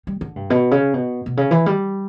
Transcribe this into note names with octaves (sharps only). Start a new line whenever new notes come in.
G3
D3
G2
B2
C#3
B2
B2
C#3
E3
G3